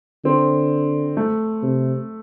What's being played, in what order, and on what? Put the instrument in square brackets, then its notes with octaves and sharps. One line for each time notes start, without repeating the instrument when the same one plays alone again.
[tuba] D3 [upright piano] C4
[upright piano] A3
[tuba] C3